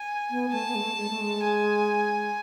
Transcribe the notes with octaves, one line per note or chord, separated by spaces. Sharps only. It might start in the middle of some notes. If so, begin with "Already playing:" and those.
Already playing: G#5
B3
A3 A5
B3
G#3
A3
G#3
A3
G#3
G#5